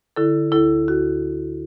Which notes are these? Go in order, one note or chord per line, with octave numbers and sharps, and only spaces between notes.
D3 E4 A4
D2 E4 A4
D2 F#4